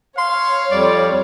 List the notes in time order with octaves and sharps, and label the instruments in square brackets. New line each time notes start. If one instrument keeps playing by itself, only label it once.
[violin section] C#5 [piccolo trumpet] F5 [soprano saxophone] C6
[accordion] F2 G3 [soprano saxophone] D5